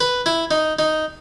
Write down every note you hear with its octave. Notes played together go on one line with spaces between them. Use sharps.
B4
E4
D#4
D#4